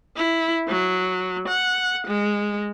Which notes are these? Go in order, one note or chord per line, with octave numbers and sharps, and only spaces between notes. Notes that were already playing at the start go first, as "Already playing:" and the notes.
E4
F#3
F#5
G#3